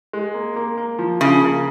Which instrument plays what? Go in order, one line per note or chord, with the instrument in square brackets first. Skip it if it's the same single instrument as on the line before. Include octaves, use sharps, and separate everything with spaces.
[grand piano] G#3
A#3
A#3
A#3
F3
[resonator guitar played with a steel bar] C#3 [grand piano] F3
[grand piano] A#3